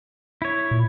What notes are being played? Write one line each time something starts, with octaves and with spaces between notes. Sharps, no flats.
E4 C#5
A#2